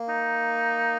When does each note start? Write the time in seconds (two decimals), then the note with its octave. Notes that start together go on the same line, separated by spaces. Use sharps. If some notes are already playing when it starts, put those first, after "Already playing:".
Already playing: A#3
0.09 D#4